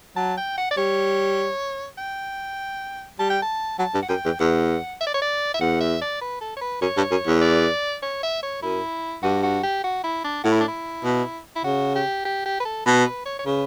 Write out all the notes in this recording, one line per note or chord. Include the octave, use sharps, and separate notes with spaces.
F#3 A5
G5
F#5
D5
G3 C#5
G5
G3 A5
G5
A5
F#3 A5
G2
F#5
F#2 G5
E2
E2 F#5
E5
D5
C#5
D5
E5
E2 F#5
E5
D5
B4
A4
C#5
B4
F#2 C#5
G2
F#2
E2
D5
C#5
E5
C#5
F#2 E4
G2 F#4
F#4
G4
F#4
E4
D4
A2 F#4
E4
D4
E4
B2
E4
C#3 F#4
G4
G4
G4
B4
A4
B2 B4
B4
C#5
C#5
C#3 B4